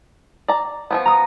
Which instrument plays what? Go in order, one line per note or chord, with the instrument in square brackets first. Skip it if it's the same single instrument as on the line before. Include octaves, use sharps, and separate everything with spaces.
[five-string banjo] D5 A#5
F3 F#3 B3
[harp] A#5 D#6